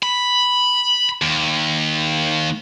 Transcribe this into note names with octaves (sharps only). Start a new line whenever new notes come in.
B5
D#2